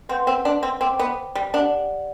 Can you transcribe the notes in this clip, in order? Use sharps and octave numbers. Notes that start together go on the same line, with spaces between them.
C4 B4 F#5 C6 G6
C4
D4
C4
C4 C5 G5 D6
B3
G3
D4 G4 D5 F#5